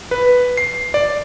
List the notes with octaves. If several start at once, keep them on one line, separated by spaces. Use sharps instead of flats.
B4
C7
D5